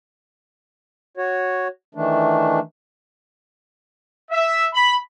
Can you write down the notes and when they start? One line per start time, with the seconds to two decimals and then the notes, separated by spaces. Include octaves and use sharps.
1.17 F#4 C#5
1.95 D#3 E3 A3 D4
4.31 E5
4.72 B5